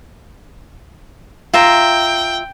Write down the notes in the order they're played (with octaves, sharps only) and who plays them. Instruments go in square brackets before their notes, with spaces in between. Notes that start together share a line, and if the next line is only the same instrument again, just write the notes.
[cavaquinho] F4 E5 A#5 [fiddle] G5